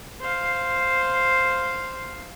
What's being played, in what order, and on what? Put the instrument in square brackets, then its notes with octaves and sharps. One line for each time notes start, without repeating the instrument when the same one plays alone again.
[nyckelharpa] C5 F5